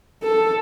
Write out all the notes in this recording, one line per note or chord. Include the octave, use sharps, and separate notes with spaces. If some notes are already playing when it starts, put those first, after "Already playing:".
A4